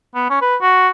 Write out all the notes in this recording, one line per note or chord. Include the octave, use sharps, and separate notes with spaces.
B3
C#4
B4
F#4